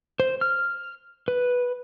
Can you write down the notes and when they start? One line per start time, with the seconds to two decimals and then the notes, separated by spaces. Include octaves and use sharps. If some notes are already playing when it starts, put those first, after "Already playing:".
0.20 C5
0.41 F6
1.28 B4